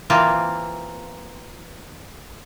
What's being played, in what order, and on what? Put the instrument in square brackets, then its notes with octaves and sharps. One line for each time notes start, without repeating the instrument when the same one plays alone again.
[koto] E3 A#3 C4 F4